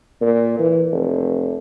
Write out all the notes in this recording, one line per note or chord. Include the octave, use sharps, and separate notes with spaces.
A#2
E3
F1